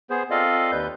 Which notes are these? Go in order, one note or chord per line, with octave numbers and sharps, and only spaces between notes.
B3 G#4 C5
C4 F4 A4 D5 D#5 F5
D#2 B4 G6